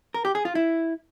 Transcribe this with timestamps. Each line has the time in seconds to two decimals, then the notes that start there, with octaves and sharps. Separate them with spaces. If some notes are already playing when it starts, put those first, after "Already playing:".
0.14 A#4
0.25 G4
0.35 G#4
0.45 F4
0.55 E4